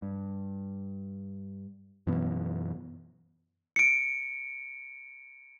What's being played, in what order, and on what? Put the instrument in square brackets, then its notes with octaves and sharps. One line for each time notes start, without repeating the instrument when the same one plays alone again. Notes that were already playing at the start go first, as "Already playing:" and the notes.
[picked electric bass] G2
F#2 B2 E3 B3
[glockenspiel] C#7 D7